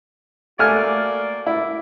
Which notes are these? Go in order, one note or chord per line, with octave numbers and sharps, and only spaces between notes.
A3 A#3 F#4 D5 G#5 F6
E4